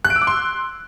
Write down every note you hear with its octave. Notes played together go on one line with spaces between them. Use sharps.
F#6
D7
E6
D6
C6